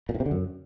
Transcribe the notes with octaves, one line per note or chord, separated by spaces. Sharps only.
A#2
A2
C3
D3
F#2